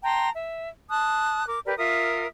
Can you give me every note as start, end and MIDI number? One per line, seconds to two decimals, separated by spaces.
0.03 0.29 79
0.03 0.29 81
0.03 0.29 82
0.03 0.29 84
0.35 0.68 76
0.90 1.45 81
0.90 1.45 87
0.90 1.45 90
1.47 1.59 70
1.47 1.59 86
1.65 1.76 67
1.65 1.76 70
1.65 1.76 71
1.65 1.76 74
1.77 2.27 65
1.77 2.27 70
1.77 2.27 76
1.77 2.27 87